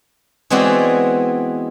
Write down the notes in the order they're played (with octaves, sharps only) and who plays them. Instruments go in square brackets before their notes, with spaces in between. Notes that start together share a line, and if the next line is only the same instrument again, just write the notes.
[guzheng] E3 G#3 B3 C4 F#4 D5